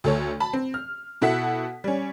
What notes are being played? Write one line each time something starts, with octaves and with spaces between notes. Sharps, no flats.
D2 A4 C#5
A5 B5
C4
F6
B2 E4 A4 F#5 B6
G3 C#4